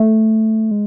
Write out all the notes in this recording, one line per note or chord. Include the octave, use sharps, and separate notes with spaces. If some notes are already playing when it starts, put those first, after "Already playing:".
Already playing: A3
G#3